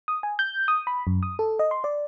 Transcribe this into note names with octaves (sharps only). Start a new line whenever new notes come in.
D#6
G#5
G6
D#6
B5
F#2
D#6
A4
D#5
C6
D5